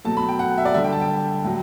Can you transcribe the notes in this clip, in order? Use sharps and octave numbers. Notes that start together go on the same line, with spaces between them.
B2 F#3 A3 A5
B5
G5
F#5
E5
D5
D3 G3 E5
G5
A5
G5
A2 F#3